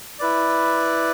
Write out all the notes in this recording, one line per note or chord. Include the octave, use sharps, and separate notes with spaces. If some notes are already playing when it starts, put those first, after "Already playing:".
E4 B4 D5